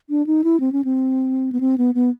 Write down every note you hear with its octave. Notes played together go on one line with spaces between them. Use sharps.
D4
D#4
E4
C4
C#4
C4
B3
C4
B3
B3